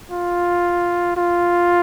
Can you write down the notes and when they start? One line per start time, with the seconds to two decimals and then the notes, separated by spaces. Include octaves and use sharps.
0.11 F4
1.17 F4